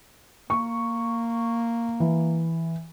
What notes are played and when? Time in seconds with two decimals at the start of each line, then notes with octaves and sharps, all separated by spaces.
0.50 A#3 C#6
2.00 E3